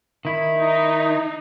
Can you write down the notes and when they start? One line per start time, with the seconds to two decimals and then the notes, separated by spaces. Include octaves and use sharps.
0.25 D#3 E4
0.58 D#4